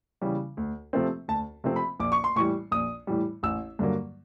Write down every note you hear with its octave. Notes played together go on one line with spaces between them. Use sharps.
C#3 E3 G3
D2
C3 F3 A3 C4
D2 A5
C3 F3 A3 C4
B5
A#1 D6
C#6
C6
A2 E3 G3 C#6
A#1 D#6
A2 E3 G3
A1 E6
G2 D3 F#3 A#3